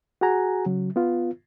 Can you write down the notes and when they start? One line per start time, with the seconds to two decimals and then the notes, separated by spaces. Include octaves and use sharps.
0.21 F#4 G#4 F#5 G#5 A#5
0.66 C#3 F#3
0.96 B3 F4